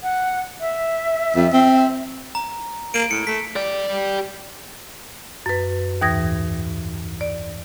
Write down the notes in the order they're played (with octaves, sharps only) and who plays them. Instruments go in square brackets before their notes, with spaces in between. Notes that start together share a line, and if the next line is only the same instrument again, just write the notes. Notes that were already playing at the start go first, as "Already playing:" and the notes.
[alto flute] F#5
E5
[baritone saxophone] F2
C4
[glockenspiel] A#5
[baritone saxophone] A#3 [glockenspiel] D7
[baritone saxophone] A2 [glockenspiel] C#7
[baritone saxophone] A3 [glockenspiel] B6
[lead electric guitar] G4 D5
[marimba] F#2 B4
D#2 G#2 E3 D#6 G#6 A#6
D5